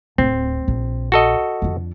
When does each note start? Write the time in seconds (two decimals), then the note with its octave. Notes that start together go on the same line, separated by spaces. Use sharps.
0.18 D1 C4
0.68 A#1
1.12 F#4 A4 D#5
1.62 F2 D3